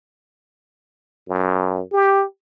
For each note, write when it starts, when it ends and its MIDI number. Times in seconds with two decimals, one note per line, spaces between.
1.28 1.82 42
1.92 2.23 67